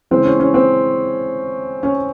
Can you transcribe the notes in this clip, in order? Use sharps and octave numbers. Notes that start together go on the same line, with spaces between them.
C#3 E3 G#3 C4
C#4
C#4
C4
C#4